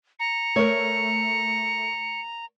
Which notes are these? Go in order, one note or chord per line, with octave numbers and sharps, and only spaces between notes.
A#5 C#7
A3 A#4 C#5